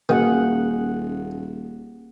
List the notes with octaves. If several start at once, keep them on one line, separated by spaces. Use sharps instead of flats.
D#1 D#3 A#3 C#4 F#4 G#4 F#5